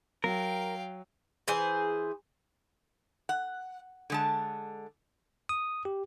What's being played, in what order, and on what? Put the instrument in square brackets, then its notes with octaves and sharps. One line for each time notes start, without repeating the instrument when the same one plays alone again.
[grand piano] F#3 [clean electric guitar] A#4 [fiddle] F5 G5
[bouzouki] E3 G#4 C5
[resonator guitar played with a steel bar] F#5
D3 G#3 A5
[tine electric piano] D#6
G4